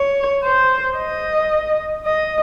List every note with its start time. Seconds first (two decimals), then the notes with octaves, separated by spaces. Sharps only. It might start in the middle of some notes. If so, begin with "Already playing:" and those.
Already playing: C#5
0.44 C5
0.97 D#5
2.05 D#5